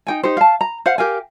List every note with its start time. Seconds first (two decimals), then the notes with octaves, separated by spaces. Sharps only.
0.07 D#4 G5 G#5
0.23 D#4 G4 C5
0.37 F5 A5
0.61 A#5
0.86 C5 F5 F#5
0.98 G4 A#4 F5 G#5